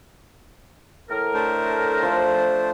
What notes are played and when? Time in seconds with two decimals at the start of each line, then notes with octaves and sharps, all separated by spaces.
1.10 A2 A#4
1.34 A3 D4 C5
2.03 F3 F5